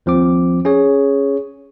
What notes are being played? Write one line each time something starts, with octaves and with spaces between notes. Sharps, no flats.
D#2 F3 C4 D6
C#4 G#4 C#5